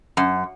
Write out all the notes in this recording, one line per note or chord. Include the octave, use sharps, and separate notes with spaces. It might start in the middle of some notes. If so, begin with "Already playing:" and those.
F#2